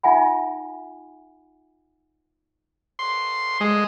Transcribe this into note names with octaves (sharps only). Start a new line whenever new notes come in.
D#4 F4 E5 F#5 G#5 B5
C6
G#3